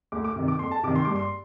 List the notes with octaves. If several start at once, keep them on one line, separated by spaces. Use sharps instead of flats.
D2 D6
D6
C3 D#3
D6
F2 C6
A5
C3 D#3 D6
C6
G2 D6
C6